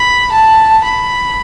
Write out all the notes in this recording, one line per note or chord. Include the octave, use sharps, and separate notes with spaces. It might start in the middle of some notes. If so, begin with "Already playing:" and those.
Already playing: B5
A5
B5